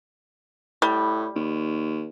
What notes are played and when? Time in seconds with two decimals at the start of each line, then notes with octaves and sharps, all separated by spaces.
0.82 A2 G3
1.36 D#2